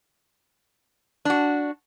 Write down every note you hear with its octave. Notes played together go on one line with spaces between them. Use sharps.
D4 F#4